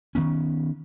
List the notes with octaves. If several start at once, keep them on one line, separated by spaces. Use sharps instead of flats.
D#3 E3 B3 C#4